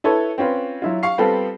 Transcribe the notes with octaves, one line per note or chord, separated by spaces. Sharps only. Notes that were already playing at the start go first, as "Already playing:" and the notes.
E4 A4 B4 C#5
C4 C#4 F4 B4
F#3 E4 F4
F5 C#6 C7
G3 B3 C4 F4 G4 A4